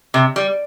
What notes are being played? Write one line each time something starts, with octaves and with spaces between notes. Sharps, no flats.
C3
G3